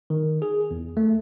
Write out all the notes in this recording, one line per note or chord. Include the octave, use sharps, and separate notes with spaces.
D#3
G#4
E2
A3